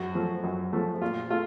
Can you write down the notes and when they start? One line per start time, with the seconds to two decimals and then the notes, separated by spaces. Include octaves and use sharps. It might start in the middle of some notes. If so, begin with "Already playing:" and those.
Already playing: F#2 F#4
0.15 F3 A3
0.44 F#2
0.73 F3 A3
1.02 A#2 F4
1.30 A3 F4